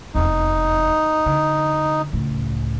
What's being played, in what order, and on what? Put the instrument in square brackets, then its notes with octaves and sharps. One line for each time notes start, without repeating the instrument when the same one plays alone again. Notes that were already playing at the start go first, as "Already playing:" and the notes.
[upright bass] F1 E2 [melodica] D#4
[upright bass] D3
C#2 A2